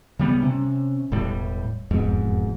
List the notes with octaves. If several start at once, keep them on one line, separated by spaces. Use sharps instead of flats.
C#3 G3 B3
C3 C#4
E1 A2 G3
E1 F2 G#2